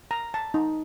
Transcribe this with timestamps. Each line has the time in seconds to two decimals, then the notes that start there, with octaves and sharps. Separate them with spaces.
0.11 A#5
0.34 A5
0.54 D#4